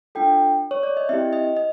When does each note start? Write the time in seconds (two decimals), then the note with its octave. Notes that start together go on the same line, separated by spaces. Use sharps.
0.15 D4 F4 A4 G5
0.71 C#5
0.83 D5
0.97 D#5
1.09 C4 E4 G4 E5
1.33 D#5
1.57 D#5